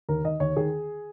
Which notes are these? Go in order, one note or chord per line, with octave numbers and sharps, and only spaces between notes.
D#2 A#4
D#3 D#5
D#2 C#5
D#3 G#4